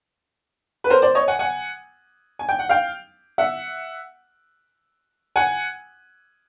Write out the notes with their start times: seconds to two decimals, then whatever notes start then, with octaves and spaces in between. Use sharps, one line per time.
0.84 B4
0.90 A#4 C5
1.02 C5 D5
1.15 C#5 D#5
1.28 F#5 G#5
1.39 F#5 G#5
2.39 G#5
2.49 G5
2.59 F#5
2.69 F5 G5
3.38 E5 F#5
5.36 F#5 G#5